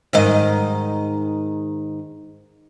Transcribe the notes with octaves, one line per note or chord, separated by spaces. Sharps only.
G#2 D#3 D#5